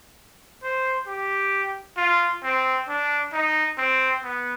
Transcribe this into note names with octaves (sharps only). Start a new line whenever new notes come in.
C5
G4
F4
C4
D4
D#4
C4
B3